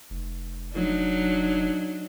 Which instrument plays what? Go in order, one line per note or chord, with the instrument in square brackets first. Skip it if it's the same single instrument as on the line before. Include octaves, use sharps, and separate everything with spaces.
[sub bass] F1
[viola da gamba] F#3 D4 D#4